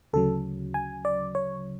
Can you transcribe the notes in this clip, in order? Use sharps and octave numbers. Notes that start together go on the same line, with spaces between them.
D2 C#3 F#3 A4
G#5
D5
C#5